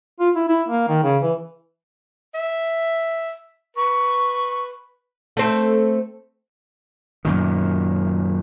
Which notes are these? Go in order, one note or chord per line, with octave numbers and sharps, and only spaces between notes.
F4
E4
E4
A#3
D#3
C#3
E3
E5
B4 C#6
A3 C4
F#2 A#2 D#3